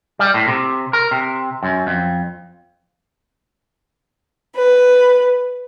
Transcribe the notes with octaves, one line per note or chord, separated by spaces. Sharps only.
G3
A2
C3
A#4
C3
F#2
F2
B4